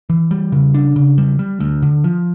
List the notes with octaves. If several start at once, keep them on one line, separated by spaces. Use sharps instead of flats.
E3
G3
C#3
D4
C#3
G3
G3
D2
D3
F3